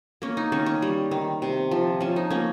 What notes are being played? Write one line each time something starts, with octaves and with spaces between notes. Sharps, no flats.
A#3 C#4
D#4
D#3 C#4
C#4
G3
D#3
C3
F3
F3 C#4
D#4
A#3 C#4